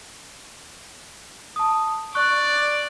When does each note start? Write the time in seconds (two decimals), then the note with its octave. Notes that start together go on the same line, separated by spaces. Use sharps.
1.56 A5 D#6
2.15 D5 C#6 F#6